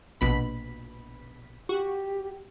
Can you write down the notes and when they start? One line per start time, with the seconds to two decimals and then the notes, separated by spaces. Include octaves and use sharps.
0.21 A#1 B2 B5
1.69 F#4 G4